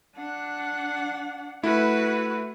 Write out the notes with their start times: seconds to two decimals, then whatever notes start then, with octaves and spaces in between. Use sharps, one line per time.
0.16 D4 F#5
1.63 A3 E4 F#4 B4